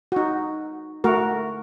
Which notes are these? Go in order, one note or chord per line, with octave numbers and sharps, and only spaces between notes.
D#4 F#4
A3 F#4 A#4